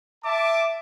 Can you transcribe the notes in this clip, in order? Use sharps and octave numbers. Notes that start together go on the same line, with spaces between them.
E5 A5 D6